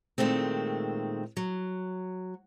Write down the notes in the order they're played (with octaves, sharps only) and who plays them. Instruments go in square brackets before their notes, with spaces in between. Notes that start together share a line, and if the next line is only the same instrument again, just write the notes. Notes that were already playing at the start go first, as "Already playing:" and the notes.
[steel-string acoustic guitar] A#2 D#3 G#3 A3 C4
F#3